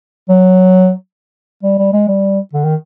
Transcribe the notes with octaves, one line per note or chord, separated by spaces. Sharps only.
F#3
G3
G3
G#3
G3
D3
D#3